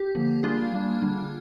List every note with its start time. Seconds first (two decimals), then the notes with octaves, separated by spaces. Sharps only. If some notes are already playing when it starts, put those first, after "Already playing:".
Already playing: G4
0.15 D3 F3 A#3
0.43 G3 A#3 D4 F4 G#4
0.73 G3 A#3 D4
1.01 D3 G3 D4